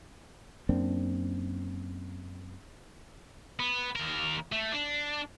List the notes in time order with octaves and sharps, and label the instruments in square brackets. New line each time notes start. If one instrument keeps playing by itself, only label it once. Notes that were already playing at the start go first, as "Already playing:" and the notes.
[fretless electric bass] F#2 A#3 C4 D4
[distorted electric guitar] B3
D#2 A#4
A3
D4